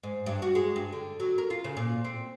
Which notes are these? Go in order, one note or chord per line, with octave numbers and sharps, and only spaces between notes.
G#2
G2
F#4
G#3
G2
D3
F#3
A#4
F4
C#3
A#2
C4